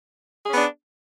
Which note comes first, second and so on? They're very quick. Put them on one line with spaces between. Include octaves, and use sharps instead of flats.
G#4 C#4 B3 D4